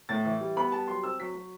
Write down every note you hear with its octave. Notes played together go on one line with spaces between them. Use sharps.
A2 A6
E3
G3
B3 B5
G3 A5
F#3 C6
C4 E6
F#3 B6
F#3